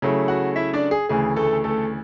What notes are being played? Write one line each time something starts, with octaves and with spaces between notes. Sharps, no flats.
C#3 F#3 A3 E4
F#4 F#5
E4 E5
D4 D5
G#4
D2 C#3 E3 G#4
A3 A4
A3 A4